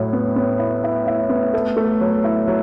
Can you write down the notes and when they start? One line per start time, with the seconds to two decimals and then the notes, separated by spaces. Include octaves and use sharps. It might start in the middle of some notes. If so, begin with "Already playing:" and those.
Already playing: A2 F#3
0.13 B3
0.36 B3
0.59 E4
0.84 E4
1.07 E4
1.29 B3
1.53 A3
1.77 A3
2.01 F#3
2.24 E4
2.48 F#3